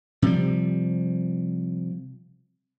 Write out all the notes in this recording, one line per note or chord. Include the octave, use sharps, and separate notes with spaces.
C3 F3 G3